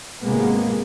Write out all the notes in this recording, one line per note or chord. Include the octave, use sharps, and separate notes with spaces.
G#1 C3 G#3 A#3 B3